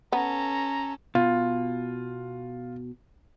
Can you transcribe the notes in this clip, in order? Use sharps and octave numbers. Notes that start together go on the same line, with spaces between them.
B3 C#4 A4 A#5
B2 F4